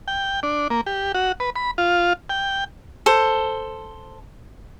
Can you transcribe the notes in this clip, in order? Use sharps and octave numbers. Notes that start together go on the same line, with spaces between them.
G5
D4
A#3
G4
F#4
B4
B5
F4
G5
A4 C5